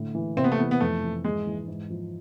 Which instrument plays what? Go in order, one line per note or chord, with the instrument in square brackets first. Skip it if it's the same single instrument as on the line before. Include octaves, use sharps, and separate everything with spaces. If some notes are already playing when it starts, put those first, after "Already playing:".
Already playing: [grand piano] A2 D3
E3
[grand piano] C3 [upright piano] C4
[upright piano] B3
A3
[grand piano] E3 [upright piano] B3
[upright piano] B3
[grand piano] F2 [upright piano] A3
[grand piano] E3
[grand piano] G#2 [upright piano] G#3
[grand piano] E3
G#2
F3